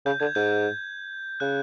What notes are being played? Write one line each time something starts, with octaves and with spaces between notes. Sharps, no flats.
C#3 G6
D3 G#6
G#2 G6
C#3 F#6